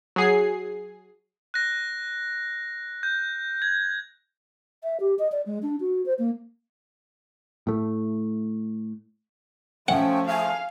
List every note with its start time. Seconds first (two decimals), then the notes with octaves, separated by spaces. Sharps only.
0.16 F#3 G#4 C7
1.54 F#6 A#6
3.03 G6
3.62 G#6
4.83 E5
5.00 G4
5.19 D#5
5.32 D5
5.46 G#3
5.62 D4
5.80 F#4
6.06 C5
6.19 A#3
7.67 A2 A3
9.88 F3 A3 C#4 F#5 G5
10.27 F5 G#5